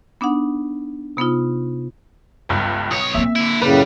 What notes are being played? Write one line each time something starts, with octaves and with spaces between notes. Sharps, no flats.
B3 D4 D#4 F#5
C3 B3 D#4 F4
G1 C#2 G2
B1 C#5 D#6
A#3 C4 E5
D3 E4
F#2 A2 C#3 G3 B4